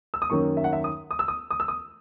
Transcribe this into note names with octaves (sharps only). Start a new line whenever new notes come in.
E6
D#6
F#2 D#3 A#3 C#4 C#6
E5
F#5
E5
D#6
D#6
E6
D#6
D#6
E6
D#6